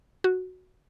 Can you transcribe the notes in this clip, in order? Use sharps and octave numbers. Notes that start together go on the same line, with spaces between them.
F#4